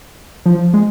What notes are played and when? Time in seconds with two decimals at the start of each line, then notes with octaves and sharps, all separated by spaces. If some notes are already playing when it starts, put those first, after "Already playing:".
0.46 F3
0.74 G#3